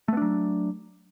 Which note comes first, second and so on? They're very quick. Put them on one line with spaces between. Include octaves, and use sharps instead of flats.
A3 B3 D4 F#3